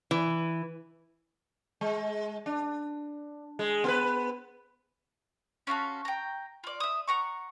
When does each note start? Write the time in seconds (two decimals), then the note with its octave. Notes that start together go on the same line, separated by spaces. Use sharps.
0.11 E3
1.81 G#3
2.46 D4
3.59 G#3 G#4
3.84 B3 A#4 B4
5.67 C#4 F4 F#4 A4
6.05 G5 A#5
6.64 F4 D5
6.80 E5 D#6
7.08 F#5 A#5 C#6